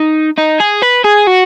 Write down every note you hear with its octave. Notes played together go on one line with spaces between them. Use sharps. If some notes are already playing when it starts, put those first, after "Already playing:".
Already playing: D#4
D#4
G#4
B4
G#4
F#4